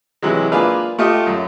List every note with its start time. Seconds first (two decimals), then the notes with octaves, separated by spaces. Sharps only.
0.22 C3 E3 F#3 G#3
0.52 A#3 D4 F4 G#4 B4 F5
0.99 A3 F4 G4 D#5
1.27 F#2